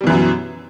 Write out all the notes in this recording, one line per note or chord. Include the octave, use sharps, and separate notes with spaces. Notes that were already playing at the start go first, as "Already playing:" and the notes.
F#2 B2 E3 F#3 G3